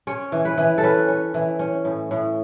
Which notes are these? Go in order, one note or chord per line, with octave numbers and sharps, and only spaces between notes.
C#4 C#5
E3
B4
E3
A4
C#4 B4
C#4
E3
C#4
A2
A2